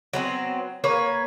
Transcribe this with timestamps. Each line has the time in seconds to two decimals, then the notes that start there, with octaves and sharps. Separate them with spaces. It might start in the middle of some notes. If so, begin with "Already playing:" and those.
0.13 F#3 B3 C4
0.84 A#3 B4 C#5